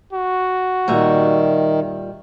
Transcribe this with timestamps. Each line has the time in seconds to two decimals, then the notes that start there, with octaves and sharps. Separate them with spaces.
0.13 F#4
0.88 A#2 D#3 G3 E5